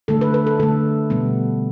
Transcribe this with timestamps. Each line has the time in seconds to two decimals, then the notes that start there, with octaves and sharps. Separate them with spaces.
0.08 D3 A3 A4
0.21 B4
0.34 B4
0.47 A4
0.60 D3 A3 A4
1.10 B2 G3 B3